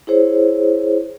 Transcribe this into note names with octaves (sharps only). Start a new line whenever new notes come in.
E4 G#4 C5 C#5